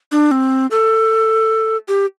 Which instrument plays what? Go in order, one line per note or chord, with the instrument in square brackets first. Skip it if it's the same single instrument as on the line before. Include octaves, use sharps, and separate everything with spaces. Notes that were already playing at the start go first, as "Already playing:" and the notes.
[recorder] D4
C4
A4
G4